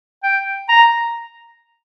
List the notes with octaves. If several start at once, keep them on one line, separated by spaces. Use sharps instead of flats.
G5
A#5